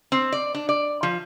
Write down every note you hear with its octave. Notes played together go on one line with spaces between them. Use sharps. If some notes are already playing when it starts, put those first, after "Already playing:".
C4
D5
D4
D5
F3